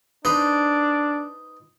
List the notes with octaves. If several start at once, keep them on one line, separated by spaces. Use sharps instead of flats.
D4 D#4 B4 C5